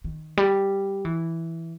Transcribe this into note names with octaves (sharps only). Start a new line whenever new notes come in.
D#3
G3
E3